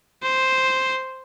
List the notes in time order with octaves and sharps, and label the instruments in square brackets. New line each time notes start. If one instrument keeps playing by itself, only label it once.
[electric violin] C5